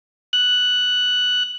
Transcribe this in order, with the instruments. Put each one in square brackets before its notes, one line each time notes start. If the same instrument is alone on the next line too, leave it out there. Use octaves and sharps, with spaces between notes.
[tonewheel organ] F#6